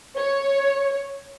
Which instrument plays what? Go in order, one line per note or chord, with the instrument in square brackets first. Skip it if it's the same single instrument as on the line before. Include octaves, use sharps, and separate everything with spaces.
[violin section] C#5